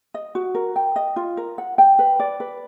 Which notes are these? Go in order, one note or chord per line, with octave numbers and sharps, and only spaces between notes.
D#5
F#4
A#4
G5
D#5
F4
A#4
F#5
G5
B4
D5
B4